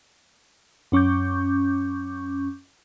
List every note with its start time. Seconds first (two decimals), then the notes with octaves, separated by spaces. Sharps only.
0.92 F#2 C#4 C#6 D6 G6